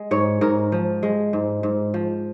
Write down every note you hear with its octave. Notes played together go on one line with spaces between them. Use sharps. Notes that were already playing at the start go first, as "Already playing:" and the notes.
Already playing: G#3
G#2 C#5
G#2 A#4
F3
G#3
G#2
G#2
F3